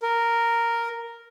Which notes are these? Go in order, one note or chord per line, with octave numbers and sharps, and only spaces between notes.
A#4